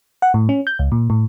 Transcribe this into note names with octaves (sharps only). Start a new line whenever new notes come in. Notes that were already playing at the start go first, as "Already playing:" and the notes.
F#5
A2
C#4
G6
C#2
A#2
A2